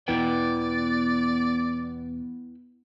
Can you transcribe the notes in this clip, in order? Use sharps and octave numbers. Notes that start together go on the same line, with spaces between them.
E2 B2 E3 B3 E4 B4 D5 G5